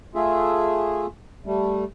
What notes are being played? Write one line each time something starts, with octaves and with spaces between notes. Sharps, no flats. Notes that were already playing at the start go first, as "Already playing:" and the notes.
A3 F4 G#4 E5
G3 A3